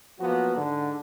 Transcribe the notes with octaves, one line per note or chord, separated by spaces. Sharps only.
F3 F#3 A#3 B3 F#4
G#2 D3